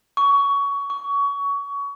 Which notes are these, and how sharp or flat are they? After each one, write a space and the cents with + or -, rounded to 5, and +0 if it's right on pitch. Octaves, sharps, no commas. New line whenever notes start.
C#6 +20
C#6 +25